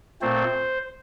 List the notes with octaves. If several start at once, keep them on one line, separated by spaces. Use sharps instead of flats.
A#2 A3 C4 C5